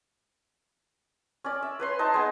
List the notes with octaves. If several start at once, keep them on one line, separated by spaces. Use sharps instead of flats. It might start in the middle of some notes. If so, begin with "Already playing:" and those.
C#4 D5
E5
B4 C#5 C6
D#4 C5 A5
G#3 B3